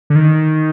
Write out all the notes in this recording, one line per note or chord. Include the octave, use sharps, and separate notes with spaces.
D3
D#3